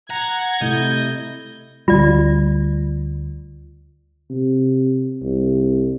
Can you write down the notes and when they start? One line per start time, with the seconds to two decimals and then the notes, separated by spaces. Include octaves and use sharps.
0.10 F#5 A#5 G#6
0.62 C3 A3 E4 D#5 G6
1.88 D2 G3 F4 D5
4.30 C3
5.22 C2